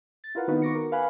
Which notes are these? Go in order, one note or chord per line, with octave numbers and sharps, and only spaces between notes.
A6
E4 F4 A#4 B4 F5 F#5
D#3 B3 C4 D#4 F#4 B4
C#6 D6 A#6 C#7
A#4
B4 F5 F#5 G#5 B5